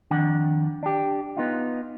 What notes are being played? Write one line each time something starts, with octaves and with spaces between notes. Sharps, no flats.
F2 D#3 D4 F#5
D4 G4
B3 D#4 F4